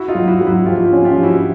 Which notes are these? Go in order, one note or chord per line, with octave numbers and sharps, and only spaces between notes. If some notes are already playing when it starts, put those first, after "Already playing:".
Already playing: E4 F#4
D#4 F4
F#3
E4 F#4
F#3
E4 F#4
F3 F4 G4
F4 G4
C#4
F4 G4
F3
E4 F#4